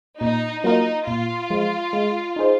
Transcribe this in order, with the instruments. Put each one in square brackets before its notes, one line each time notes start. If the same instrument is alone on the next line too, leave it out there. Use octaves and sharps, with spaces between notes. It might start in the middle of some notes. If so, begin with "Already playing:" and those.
[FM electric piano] A#2 [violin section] D#4
[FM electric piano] F#3 A#3 F4 A#4 [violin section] D#4
[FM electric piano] A#2 [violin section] F4
[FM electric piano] F3 G#3
G#3
D#4 G#4 C5